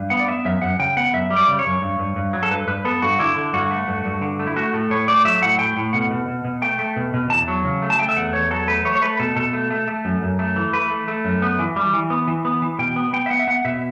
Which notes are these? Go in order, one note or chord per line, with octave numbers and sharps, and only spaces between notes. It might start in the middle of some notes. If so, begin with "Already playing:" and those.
Already playing: G2
B3 F#5
D5
B3 E5
F#2 E5
F#2 F#5
C#3 G5
B3 F#5
F#2 E5
G3
D5
C#3
C#5
F#2
G2
G2
G2
F#3
A4
G2 B4
G2 B4
B3 A4
G2 F#4
D3 E4
D3
G2 F#4
A3
G2
G2
D3
A3
E4
A3 F#4
A2 A4
A2 C#5
A3 D5
F#3 E5
A2 F#5
A2 G5
A2
B2 F#5
B2
B2
B2
A3 G5
A3
B2
B2
E2 A5
F#3
C#3
A3
A5
A3 G5
E5
E2 F#5
E2 C#5
F#3 A4
A3 B4
A3 C#5
C#5
A3 B4
B2 A4
B2 A4
A3
A3
A3
F#2
F#2
A3
E3
A3 B4
A3
A3
F#2
B3
E3
G3
E3
B3
E3
B3
E3
B2 G5
B3
B3 G5
E5
B3 F#5
E5
B3 F#5
B2 E5